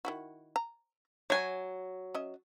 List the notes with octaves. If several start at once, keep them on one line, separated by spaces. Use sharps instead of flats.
D#3 E4 F#4
A#5
F#3 C#5 G#5
C#4 D#5 E5